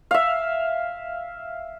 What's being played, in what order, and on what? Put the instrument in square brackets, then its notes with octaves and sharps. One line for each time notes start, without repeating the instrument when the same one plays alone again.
[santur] E5 F5